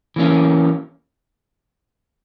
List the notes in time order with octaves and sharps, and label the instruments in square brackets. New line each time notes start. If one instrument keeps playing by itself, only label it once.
[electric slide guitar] E3 A#3 C#4